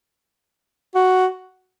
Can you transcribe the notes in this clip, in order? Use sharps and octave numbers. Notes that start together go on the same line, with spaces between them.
F#4